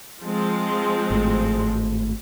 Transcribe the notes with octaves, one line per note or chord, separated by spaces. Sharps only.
F3 G#3 C4
G#1 A2